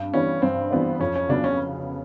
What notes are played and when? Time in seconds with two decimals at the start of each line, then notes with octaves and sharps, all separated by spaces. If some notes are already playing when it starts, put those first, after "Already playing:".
Already playing: G2
0.14 E3 G3 B3 C#4 D4
0.42 G2 C4
0.71 E3 G3 B3 D4
1.00 F2 C#4
1.15 C#4
1.29 C#3 F#3 B3 D4
1.44 C#4